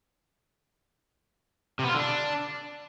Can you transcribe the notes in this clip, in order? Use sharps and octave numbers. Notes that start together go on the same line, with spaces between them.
C3
B3
F4
D3
D4